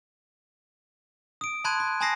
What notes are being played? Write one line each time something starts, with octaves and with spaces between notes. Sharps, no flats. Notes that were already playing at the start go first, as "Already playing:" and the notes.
D#6 D7
A5 B5 C6 F#6 G#6 D#7
B5
G#5 A5 B5 D#6 A#6 C7